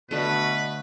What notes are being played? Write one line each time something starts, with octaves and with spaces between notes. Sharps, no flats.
B2 D3 A3 B4